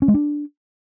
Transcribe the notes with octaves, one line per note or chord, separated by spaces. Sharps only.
C#4
G#3
D4